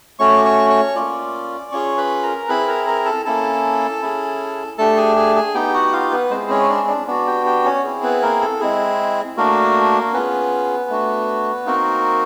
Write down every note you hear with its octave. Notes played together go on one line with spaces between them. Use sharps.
A3 C#4 F#4 C#5 C#6
D6
C#5 C#6
C#5 C#6
A#3 C#4 F4 D5 D6
C#4 F4 G#4 C#5 C#6
B4 B5
A#4 A#5
C4 E4 G#4 B4 B5
A#4 A#5
A#4 A#5
A4 A5
A#3 C#4 E4 A4 A5
C#4 E4 G#4
A3 D4 G4 A4 A5
G#4 G#5
G#4 G#5
G#4 G#5
B3 D#4 G4 G5
F#4 F#5
F4 F5
B3 B4
G#3 C4 E4 G#4 C5
C#4 C#5
D4 D5
D4 D5
B3 D4 F#4 D5
G4 G5
G4 G5
C#4 C#5
C4 E4 G#4
B3 B4
A#3 A#4
A4
G#3 C4 E4 G#4
A3 A#3 D4 F#4 A#4
B3 C#4 F4 G#4 B4
A3 D4 F#4
A#3 C4 D#4 F#4 A#4